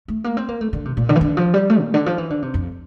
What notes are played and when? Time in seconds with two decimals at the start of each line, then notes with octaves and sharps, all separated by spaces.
0.08 A3
0.24 A#3
0.37 C4
0.48 A#3
0.61 A3
0.73 D3
0.85 C3
0.97 A#2
1.09 D3
1.16 E3
1.21 D3
1.37 F3
1.54 G3
1.70 A3
1.81 A#2
1.94 D3
2.06 F3
2.18 E3
2.30 D3
2.42 C3
2.54 F2